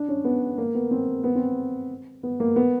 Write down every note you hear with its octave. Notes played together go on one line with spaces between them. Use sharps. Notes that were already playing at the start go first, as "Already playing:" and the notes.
Already playing: D4
C#4
B3
A#3
B3
C4
B3
C4
B3
A#3
B3